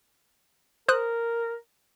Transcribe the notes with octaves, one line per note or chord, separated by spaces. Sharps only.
A#4 C5 D#6 F#6